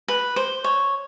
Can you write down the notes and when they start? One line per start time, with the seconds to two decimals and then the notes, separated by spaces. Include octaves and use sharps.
0.08 B4
0.36 C5
0.64 C#5